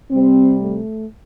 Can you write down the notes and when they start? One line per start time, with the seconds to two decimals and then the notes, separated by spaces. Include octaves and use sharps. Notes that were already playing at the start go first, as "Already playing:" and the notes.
0.11 C3 G3 C4
0.60 A3